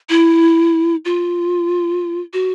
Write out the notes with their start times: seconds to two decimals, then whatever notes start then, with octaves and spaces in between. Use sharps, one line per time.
0.10 E4
1.05 F4
2.33 F#4